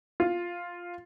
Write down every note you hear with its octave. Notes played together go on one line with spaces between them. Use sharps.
F4